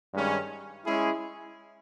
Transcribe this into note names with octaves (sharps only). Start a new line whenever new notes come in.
G2 D#3 G#3 C#4
G#3 C#4 E4 G#4